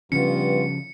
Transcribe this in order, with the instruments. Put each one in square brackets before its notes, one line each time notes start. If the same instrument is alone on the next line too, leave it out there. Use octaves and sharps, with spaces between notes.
[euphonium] G2 [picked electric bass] C#3 F3 C#4 [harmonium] B3 F4 F#4 [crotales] C#7